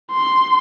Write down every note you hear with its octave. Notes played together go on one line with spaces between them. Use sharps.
C6